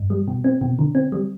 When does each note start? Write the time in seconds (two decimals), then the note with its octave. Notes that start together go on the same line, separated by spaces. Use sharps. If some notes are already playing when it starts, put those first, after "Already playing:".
Already playing: G2
0.10 G3
0.28 B2
0.44 C4
0.61 B2
0.79 D3
0.95 C4
1.12 G3